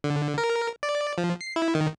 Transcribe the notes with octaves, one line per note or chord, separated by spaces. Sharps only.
D3
A#4
D5
F3
C7
E4
D#3